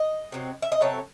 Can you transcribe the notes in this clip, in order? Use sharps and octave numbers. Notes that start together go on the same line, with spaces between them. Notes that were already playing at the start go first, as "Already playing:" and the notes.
Already playing: D#5
C3 F#3 C4
E5
D#5
C3 F#3 C4 A4 C#5